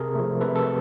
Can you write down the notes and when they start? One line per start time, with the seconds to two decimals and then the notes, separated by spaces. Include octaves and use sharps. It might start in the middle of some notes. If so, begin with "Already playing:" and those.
Already playing: C3 G#4 A#4
0.15 F3 A3
0.41 C3 A4 B4
0.55 A4